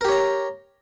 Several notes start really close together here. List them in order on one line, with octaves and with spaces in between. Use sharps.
A#4 G4 C#5 A#5